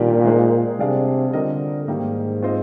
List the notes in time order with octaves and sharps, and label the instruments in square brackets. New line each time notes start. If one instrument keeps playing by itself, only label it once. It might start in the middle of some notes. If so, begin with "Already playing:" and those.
Already playing: [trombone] A#2 [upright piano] D#3 G3 A#3 D4 G4
[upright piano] G#3 D#4 G#4 C5
[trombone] C3 [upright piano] G3 D4 G#4 D5 F5
[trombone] D3 [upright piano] G3 C4 F4 A#4 D#5
[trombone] G#2 [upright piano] D#3 G3 A#3
[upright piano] C4 F4 C5 D#5